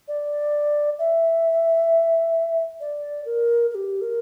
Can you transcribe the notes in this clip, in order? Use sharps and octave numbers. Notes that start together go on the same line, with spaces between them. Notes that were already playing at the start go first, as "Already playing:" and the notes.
D5
E5
D5
A#4
A#4
G4
A#4